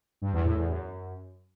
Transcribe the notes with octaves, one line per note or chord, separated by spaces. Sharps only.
G2
E2
A2
E2
F#2